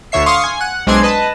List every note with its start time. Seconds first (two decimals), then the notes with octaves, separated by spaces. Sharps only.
0.12 D2 D3 C#5 E5 C7
0.26 F5 C6 C#6 D#6
0.44 G#5
0.61 F#5
0.87 B1 G#3 C4 D4 C6 G#6
1.03 B4 D#5 A5